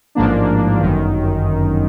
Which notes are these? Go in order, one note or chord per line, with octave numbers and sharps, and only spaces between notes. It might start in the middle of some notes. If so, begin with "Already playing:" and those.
A1 G#2 F3 A#3 D4
G1 F#2 D#3